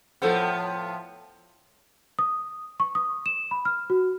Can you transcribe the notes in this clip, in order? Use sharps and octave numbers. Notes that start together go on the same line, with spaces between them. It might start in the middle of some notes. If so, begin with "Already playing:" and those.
A2 F3 B3 A4 C5 F#5
D#6
C#6
D#6
E7
B5
F6
F#4